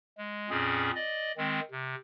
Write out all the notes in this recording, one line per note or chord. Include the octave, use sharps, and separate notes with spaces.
G#3
F2 A#2 C4 C#4 G#4
D5 D#5
D#3 G#3 C4
C3